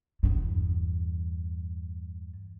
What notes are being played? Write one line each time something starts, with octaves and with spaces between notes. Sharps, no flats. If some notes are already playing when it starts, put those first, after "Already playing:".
E2 G2